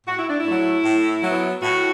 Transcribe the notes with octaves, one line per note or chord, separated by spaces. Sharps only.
A2 F#4
E4
D4
E4
F#3 A3
A2
F#3 B3
A2 F#4